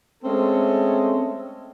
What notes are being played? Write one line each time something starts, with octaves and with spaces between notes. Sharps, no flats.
G#3 A3 C4 C#4 A4